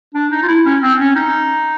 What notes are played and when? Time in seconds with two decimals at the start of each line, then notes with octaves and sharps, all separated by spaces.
0.14 D4
0.31 D#4
0.43 F4
0.48 E4
0.65 C#4
0.82 C4
0.99 C#4
1.16 D#4